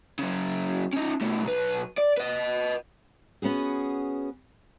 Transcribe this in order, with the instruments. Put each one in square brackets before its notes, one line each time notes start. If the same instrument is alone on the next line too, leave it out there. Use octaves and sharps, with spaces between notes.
[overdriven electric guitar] C#3 F#3
C#4 D#4
B2 A3
B1 B4
D5
B4 D#5
[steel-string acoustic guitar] B3 C#4 F#4 G#4